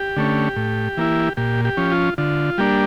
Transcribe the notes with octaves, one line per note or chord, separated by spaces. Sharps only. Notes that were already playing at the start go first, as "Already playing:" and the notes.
Already playing: G4
D3 A3 C#4
A2
E3 A#3 E4
A#2 G4
G4
F3 C#4
F4
D3 F4
G3 A#3 D4 G4